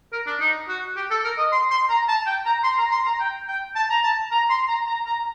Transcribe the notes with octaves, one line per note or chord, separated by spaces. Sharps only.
A#4
D4
D#4
F#4
G4
A4
A#4
D#5
C6
C6
A#5
A5
G5
A#5
C6
A#5
C6
A#5
G5
G5
A5
A#5
A5
A#5
C6
A#5
A#5
A#5